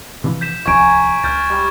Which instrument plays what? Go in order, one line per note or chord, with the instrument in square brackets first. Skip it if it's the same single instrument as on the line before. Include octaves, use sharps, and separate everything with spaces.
[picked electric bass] C3 E3 F3
[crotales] G6 B6 E7
[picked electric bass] D1 C2 F3 [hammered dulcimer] G#5 A#5 [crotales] C#6 G#6 D7
[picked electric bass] C#2 [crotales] F6 G6 A6
[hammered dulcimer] G3